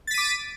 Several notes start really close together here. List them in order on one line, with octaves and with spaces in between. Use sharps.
A6 B6 D#7 D6